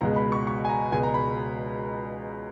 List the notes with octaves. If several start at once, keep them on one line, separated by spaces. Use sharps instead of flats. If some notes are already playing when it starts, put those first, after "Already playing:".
C#2 B2 G#3 A#5
B5
C#6
C#6
G#5
A#5
C#2 B2 G#3 G#5
A#5
B5